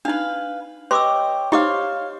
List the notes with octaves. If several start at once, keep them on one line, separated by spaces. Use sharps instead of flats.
D4 D#4 B4 F5
G4 B4 C#5 D#5 C6 D6 E6
D#4 G4 C5 C#5 D#5 F5 D6